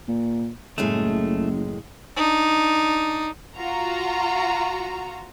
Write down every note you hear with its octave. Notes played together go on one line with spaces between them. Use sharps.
A#2
F#1 F#2 A2 G#3 A3
D4 D#4
F4 F#4 A#5